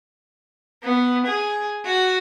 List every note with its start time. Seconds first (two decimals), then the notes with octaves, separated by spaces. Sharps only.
0.84 B3
1.27 G#4
1.85 F#4